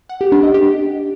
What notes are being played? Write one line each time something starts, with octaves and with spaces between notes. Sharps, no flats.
F#5
G4
D4
D#5
G4